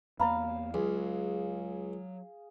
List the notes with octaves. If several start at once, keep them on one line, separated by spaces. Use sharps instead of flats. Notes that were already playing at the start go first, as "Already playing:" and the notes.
E2 A#3 D5 F5 A#5 B5
C#2 F#3 G#4